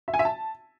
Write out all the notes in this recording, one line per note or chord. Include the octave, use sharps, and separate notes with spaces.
E5
G#5
E5
A5